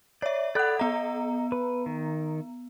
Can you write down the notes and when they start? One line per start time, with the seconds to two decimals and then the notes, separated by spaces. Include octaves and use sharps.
0.22 C#5 D5 E5
0.55 A4 D5 F#5 B5 F#6
0.79 B3 D#5 A#5
1.52 B4
1.86 D#3